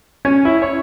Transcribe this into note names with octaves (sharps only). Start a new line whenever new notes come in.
C#4
E4
C#5